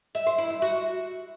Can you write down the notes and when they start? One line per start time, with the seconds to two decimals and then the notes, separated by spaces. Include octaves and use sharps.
0.15 E5
0.27 C5
0.38 E4
0.50 E5
0.62 F#4